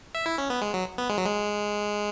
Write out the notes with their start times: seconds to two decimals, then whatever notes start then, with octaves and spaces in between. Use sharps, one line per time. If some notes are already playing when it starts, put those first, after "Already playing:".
0.15 E5
0.26 E4
0.38 C#4
0.50 B3
0.62 G#3
0.74 F#3
0.98 B3
1.10 G#3
1.18 F#3
1.25 G#3